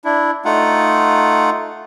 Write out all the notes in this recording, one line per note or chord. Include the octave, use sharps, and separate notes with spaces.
D4 E4
A3 D#4 F4 F#5